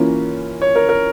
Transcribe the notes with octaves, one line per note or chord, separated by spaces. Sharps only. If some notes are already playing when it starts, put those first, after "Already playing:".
Already playing: E3 A#3 C#4 F4
C#5
A#4
A#4